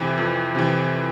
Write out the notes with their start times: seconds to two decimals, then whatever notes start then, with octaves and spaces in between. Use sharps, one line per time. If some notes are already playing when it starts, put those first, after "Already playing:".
Already playing: F2 C3 E3
0.18 F2
0.55 C3 E3